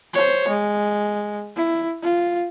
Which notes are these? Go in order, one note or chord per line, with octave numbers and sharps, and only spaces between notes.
C5 C#5
G#3
E4
F4